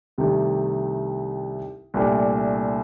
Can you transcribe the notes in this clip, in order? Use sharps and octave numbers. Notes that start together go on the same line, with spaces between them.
C2 C3 D#3 A3 D#4
C2 A#2 A3 D4